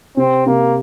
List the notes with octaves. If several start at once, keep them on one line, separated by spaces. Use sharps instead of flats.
C3 C4
C3 A#3